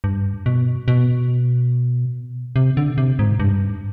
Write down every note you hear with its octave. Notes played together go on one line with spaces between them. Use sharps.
G2
B2
B2
C3
D3
C3
G#2
G2